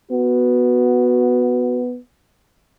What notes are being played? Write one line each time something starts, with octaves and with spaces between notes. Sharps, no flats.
B3 F#4